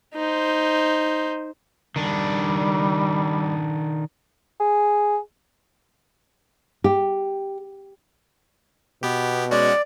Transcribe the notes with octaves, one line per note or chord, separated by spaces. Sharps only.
D#4 C5
D#3 G3 D4
G#4
G4
B2 B3 G4
G#3 C#4 F#4 D5